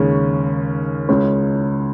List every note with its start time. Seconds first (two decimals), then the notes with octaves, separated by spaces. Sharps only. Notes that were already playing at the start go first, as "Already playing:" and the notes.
Already playing: D#2 C#3 G#3 C#4
1.09 C#2 C#3 G#3 C#4